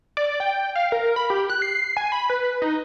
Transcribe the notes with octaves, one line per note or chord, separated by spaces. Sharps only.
D5
G5
F5
A#4
B5
G4
F#6
C7
G#5
B5
B4
D#4